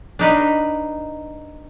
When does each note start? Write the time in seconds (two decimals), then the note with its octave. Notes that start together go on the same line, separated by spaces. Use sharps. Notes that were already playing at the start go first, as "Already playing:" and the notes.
0.19 D4 D#4 B4